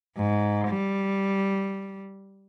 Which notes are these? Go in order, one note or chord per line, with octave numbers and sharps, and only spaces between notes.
G#2
G3